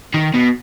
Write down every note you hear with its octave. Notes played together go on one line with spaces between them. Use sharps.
D#3
B2